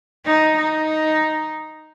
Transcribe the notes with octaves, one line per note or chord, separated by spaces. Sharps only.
D#4
D#4